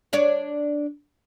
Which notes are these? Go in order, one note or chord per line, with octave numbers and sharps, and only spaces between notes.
D4 C#5 D5